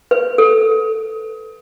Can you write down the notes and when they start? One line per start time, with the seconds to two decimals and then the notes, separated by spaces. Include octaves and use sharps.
0.11 B4
0.38 A4